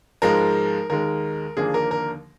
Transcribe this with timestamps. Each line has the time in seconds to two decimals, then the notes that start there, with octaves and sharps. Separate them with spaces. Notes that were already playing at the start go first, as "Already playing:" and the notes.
0.22 G#2 F3 G#3 A#4
0.90 D#2 D#3 G#3 A#4
1.57 D#2 D3 F3 A#3 D4 G#4
1.74 A#4
1.91 A#4